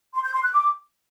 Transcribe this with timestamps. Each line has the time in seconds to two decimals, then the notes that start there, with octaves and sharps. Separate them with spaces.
0.14 C6
0.23 G6
0.33 C6
0.43 F#6
0.52 D6